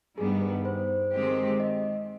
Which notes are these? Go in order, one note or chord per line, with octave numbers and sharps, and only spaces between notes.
G2 D#3 G3 B3 G#4
B4
C5
D#3 G#3 C4 G4
D#5